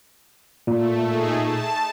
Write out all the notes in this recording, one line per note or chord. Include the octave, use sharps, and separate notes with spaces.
A#2 A3
A3 D#4 G#4
A5